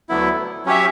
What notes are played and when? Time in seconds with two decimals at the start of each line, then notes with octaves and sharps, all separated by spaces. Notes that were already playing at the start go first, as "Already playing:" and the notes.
0.09 D2 D3 F#3 B3 E4
0.66 F#3 C#4 G4 C#5 E5